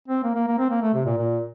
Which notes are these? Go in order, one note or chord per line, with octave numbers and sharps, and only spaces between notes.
C4
A#3
A#3
A#3
C4
A#3
A3
C3
A#2
A#2